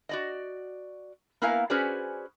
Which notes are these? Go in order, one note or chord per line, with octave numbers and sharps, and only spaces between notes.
F#4 D5 D#5
A#3 B3 E4 A#4 F5 G#5
C#4 F#4 G#4 B4 C5 D5